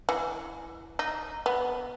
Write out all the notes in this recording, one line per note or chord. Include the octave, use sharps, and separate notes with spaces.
E3
D#4
B3